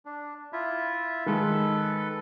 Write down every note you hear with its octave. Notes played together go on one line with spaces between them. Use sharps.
D4
E4 F4 E5
D#3 G#3 A4 B4